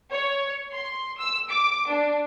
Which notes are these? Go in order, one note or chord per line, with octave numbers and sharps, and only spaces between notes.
C#5
C6
E6
D6
D4